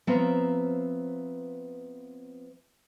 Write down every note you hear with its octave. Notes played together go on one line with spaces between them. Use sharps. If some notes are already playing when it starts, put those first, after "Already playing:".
F3 B3 C4 E5 F5 A#5